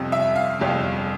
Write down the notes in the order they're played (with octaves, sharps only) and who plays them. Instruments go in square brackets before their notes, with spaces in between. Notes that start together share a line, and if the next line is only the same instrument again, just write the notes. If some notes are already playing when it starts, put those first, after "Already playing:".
Already playing: [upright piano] G1 F2 C3
[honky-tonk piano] E5
F5
[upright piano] G1 F2 C3